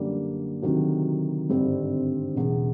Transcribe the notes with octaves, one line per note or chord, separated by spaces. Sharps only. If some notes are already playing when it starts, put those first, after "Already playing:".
Already playing: F#2 D3 G3 A#3 D4
D2 C3 D#3 F#3
G#1 G2 D3 G3 C4
E1 E2 C#3